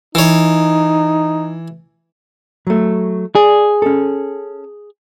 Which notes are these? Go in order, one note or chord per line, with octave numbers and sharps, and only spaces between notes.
E3 D#4 C#5
F#3 A3
G#4 D5
C#4 A4